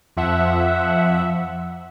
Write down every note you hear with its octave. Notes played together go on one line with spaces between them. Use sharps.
F2 F3 E5 F#5